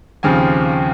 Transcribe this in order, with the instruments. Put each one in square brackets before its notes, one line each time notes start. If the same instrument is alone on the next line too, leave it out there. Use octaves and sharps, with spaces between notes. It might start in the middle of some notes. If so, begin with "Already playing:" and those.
[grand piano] D#2 C#3 F3 C4 G#5